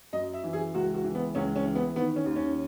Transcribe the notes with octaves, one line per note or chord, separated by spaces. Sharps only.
F#2 D#5
E5
E3
G#4
C#2 F#4
F#4
E3
B3
C#2 C#4
C#4
E3
B3
D#3 B3
C#4
D#2
C#4